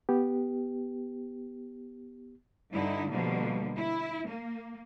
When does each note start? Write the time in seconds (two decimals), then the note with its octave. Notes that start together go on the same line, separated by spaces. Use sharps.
0.09 B3 G4
2.72 G2 D3 D#4 E4
3.10 B2 D3 F3 G3 A#3
3.76 E4
4.28 A#3